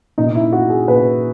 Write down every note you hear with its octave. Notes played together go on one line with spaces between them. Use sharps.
A#2 D#4
E4
F#4
G#4
A#2 B4